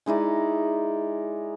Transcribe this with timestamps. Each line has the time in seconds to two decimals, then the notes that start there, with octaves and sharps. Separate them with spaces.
0.06 G#3 D#4 E4 D5